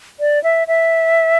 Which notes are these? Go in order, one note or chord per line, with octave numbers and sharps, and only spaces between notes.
D5
E5
E5